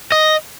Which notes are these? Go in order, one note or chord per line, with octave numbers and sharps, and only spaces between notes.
D#5